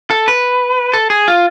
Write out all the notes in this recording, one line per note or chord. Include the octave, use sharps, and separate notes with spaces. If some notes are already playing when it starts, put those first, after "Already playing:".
A4
B4
A4
G#4
F4